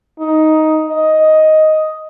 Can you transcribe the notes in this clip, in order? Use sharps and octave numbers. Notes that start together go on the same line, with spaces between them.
D#4
D#5